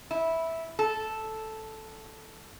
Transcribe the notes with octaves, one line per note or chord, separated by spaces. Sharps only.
E4
A4